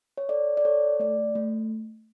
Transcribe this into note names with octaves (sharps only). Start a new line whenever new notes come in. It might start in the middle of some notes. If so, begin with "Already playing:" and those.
C#5
A4 D5
D5
A4 C#5
A3 D5
A3